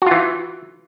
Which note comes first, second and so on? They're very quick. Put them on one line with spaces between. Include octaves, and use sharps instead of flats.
F#4 F4 E3